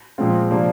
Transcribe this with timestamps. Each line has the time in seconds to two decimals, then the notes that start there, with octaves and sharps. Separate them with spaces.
0.18 A#2 F3 G#3 C4 F4
0.50 C3 F3 A#3 D4